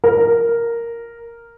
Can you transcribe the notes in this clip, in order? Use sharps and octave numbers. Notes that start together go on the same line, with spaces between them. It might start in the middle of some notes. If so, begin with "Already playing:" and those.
A#4